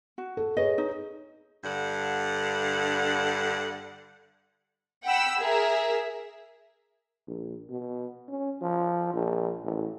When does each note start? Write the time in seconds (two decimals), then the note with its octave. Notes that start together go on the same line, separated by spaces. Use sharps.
0.18 F#4
0.37 A4
0.57 G#4 B4 C#5 D#5
0.78 D#4
1.63 G2 D3 F#5
5.03 F#5 G5 B5 E6
5.39 G#4 A#4 E5
7.27 A#1
7.69 B2
8.28 C#4
8.62 F3
9.14 A#1
9.64 A1